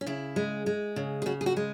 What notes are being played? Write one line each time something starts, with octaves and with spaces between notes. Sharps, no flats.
C#4
C#3 E4
G#3
G#3
C#3
G#4
C#3 F#4
G#4
F#4
G#3